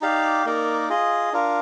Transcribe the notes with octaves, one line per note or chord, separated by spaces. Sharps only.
D#4 G4 D5 F5
A#3 D#4 A#4 D5
F4 G#4 D#5
D4 F4 A#4